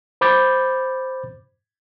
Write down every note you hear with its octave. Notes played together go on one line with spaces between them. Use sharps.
C5 B5 D6 G6 A6